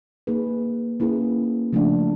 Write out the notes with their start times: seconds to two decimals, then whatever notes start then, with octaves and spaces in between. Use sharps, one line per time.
0.27 A#3 D#4 G#4 B4
1.00 A#3 C#4 E4 G#4 B4
1.73 C#3 F3 A3 D4